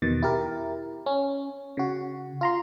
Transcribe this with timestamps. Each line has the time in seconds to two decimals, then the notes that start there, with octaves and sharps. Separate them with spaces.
0.02 E2 B2 D#3 A6
0.23 E4 G4 A#4
1.06 C#4
1.77 C#3 F#4
2.41 F4 A#5 C6